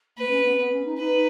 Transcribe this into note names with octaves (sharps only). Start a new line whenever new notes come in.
A#3 B4
B3
C#4
B3
B3
C#4
D#4
D#4 B4